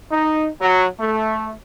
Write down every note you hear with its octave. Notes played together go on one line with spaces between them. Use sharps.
D#4
F#3
A3